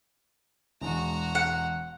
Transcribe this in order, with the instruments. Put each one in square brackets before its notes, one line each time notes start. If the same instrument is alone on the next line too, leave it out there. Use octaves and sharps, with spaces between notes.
[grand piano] E1 G#3 [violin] F#4 A#5
[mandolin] F#5